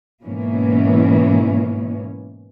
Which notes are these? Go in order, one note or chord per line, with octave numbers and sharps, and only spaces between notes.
G#2 B2 E3 A#3 C#4